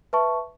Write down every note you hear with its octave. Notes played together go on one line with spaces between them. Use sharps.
B4 E5 A5 C#6